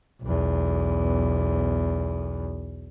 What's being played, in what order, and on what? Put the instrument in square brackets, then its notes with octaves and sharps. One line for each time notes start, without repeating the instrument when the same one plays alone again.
[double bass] B1 E2